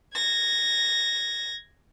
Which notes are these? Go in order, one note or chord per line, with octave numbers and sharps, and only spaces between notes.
G#6 A#6